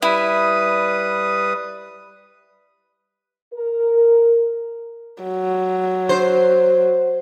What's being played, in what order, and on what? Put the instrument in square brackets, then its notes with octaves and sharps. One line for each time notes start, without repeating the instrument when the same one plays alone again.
[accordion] G3 B4 D#6 [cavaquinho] E4
[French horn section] A#4
[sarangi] F#3
[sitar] C5